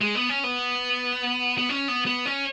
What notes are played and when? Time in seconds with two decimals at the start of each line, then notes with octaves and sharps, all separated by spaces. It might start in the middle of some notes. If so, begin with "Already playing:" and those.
0.01 G#3
0.15 B3
0.29 C#4
0.44 B3
1.58 B3
1.69 C#4
1.88 B3
2.06 B3
2.26 C#4